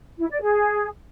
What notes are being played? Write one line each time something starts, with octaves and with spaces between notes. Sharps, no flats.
E4
D5
G#4